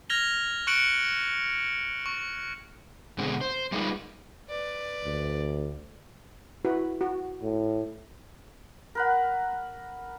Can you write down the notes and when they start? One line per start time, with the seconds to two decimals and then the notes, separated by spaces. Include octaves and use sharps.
0.10 F6 G#6 A#6 F7 G7
0.67 C#6 F#6 C#7 D7 F#7
2.06 C#6
3.18 B2 D3 G#3 C4
3.41 C5
3.72 G3 G#3 A#3 D#4 F4 B4
4.49 B4 D5
5.04 D2
6.65 E4 F#4 B4
7.01 F#4
7.42 A2
8.95 A#4 B4 F#5